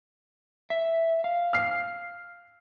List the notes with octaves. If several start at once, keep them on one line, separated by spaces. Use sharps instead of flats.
E5
F5
F6 C7